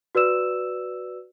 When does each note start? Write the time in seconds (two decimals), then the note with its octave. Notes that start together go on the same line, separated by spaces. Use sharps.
0.15 F#4 B4 D5 E6 E7